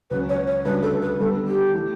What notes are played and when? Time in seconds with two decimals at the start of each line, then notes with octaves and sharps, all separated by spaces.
0.10 C#2 C#3 F#3 C#4 B4
0.29 C#5
0.47 C#5
0.65 D2 C#3 G3 D4 B4
0.82 A4
1.02 B4
1.19 D3 G3 B3 A4
1.47 G4
1.73 E3 A3